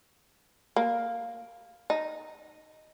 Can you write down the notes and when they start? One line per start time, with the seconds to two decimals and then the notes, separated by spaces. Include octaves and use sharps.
0.76 A#3
1.90 D#4